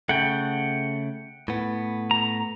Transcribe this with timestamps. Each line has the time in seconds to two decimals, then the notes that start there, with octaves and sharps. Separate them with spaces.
0.09 C#3 A3 F#5 G5
1.48 A2 B3
2.11 A#5